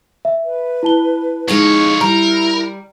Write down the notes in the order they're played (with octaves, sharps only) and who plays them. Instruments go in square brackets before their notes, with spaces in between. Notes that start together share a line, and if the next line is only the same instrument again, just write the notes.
[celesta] E5
[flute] B4
[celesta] E4 A5 G7
[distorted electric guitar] F2 C#5 [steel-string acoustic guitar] G#3 C#4 D#4
[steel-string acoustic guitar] G3 [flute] E4 [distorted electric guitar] A#4 [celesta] A#5